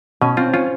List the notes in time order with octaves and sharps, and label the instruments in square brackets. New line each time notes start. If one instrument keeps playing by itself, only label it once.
[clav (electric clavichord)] B2 [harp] C#4
[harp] C4 [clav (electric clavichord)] F4
[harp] C#4 [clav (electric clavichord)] F4